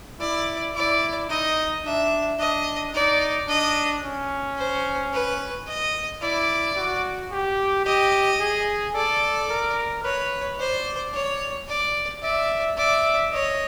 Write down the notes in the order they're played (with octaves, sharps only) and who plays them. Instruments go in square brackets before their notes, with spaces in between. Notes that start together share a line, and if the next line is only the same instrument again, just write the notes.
[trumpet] E4 [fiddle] D5
[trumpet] E4 [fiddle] D5
[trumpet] D#4 [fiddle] D#5
[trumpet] D4 [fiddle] E5
[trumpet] D4 [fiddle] D#5
[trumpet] D#4 [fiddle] D5
[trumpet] D4 [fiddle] D#5
[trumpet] C#4
[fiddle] C5
B4
D#5
[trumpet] E4 [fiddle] D5
[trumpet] F#4
G4
[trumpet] G4 [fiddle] D#5
[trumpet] G#4
[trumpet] A4 [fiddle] D5
[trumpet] A#4
[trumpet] B4 [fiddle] C#5
[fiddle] C5 [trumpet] D5
[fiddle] C#5
D5
[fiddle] D5 [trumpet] E5
[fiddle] D5 [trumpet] E5
[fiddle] C#5 [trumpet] D#5